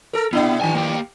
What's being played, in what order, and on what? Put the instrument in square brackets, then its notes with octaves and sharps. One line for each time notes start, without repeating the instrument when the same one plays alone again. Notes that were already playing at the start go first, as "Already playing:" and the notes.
[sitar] A4 A#4
[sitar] B2 D4 E4 [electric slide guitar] B3
[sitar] G2 D#3 [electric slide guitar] G#5 A5
[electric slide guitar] A#3 G4 G5